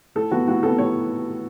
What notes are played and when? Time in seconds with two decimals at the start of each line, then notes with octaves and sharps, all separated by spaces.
0.15 A2 A4
0.31 F#3 B3 F#4
0.47 A2 F#4
0.63 F#3 B3 A4
0.78 A2 C#5